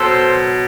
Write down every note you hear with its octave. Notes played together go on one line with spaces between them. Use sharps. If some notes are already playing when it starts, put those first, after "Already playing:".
Already playing: B2 F#3 A4 C5